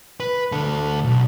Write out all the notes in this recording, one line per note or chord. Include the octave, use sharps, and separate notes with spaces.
B4
D2 A4
B1